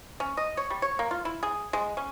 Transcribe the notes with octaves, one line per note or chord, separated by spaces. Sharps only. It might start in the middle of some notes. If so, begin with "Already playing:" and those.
C#4
D#5
C#5
G3
C#5
A#3
F4
E4
G#4
G#3
C#4